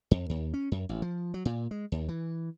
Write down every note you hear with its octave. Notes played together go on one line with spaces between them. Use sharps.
F2
D#2
C#4
F#2
A1
F3
F#3
A#2
G#3
D#2
E3